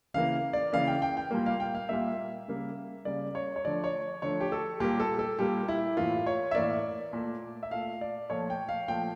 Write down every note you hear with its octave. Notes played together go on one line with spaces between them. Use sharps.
C#3 E3 A#3 F5
D5
C#3 E3 A#3 F5
G5
G5
G5
A#2 G3 A#3
F5
G5
F5
A#2 G3 A#3 E5
C#3 G3 A#3
C#3 G3 A#3 D5
C#5
C#5
D3 F3 A3 D5
C#5
D3 F3 A3 C#5
G4
A4
A#2 G3 A#3 G4
A4
A4
A#2 G3 A#3 G4
E4
A2 E3 A#3 F4
C#5
E5
A2 E3 A#3 D5
A#2 A3
E5
A#2 A3 F5
D5
A#2 F3 A3 C#5
G5
F5
A#2 F3 A3 G5